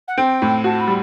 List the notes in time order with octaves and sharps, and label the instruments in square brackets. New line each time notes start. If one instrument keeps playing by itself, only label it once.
[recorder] F#5
[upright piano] C4 [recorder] G5
[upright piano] A2
[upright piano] F#4 [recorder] A5
[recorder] B5
[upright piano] G3